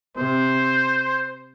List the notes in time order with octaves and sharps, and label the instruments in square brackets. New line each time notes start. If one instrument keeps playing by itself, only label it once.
[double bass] C3 [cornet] C5